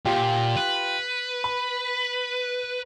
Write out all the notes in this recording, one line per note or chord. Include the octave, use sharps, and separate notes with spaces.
A#2 F4 G4 G5
B4
B5